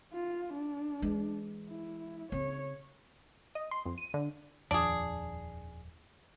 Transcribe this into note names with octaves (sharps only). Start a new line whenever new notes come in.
F4
D4
E3 G#3
E4
C#3 C4 C#5
D#5
C6
F2
D#7
D3
D#1 F2 D4 G#4